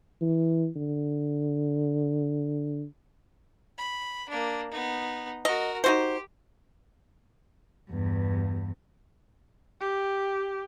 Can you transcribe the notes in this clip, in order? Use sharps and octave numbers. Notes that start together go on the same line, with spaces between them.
E3
D3
B5
A#3 D4
B3 D#4
F#4 A#4 D#5
D#4 F#4 G4 C5
E2 G2
G4